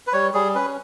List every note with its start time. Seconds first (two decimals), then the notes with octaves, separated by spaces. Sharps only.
0.07 B4
0.13 G3 C#5
0.34 G3 G#4
0.55 C#4 B4